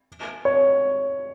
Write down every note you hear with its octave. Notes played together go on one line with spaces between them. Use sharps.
C#5